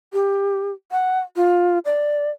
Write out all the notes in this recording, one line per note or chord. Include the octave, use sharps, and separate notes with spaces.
G4
F#5
F4
D5